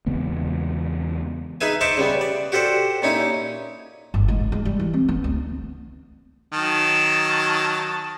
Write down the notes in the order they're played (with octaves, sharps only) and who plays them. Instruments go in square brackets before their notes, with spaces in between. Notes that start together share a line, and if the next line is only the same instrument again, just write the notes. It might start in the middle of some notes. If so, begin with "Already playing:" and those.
[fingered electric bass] E2 C#3 G#3 B3
[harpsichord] D#4 G#4 B4 E5 G#5
C5 D#5 E5 A5 C#6 D6
C#3 G3 B3
D5
F#4 G4 A4 C5 D5
A#2 C#4 D#4 E4
[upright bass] G1
G#2
D3
G#3
G3
E3
C4
B3
D2
[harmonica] D#3 F#3 A5